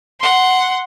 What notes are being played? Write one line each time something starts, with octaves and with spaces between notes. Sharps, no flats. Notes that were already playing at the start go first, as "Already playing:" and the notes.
F#5 C6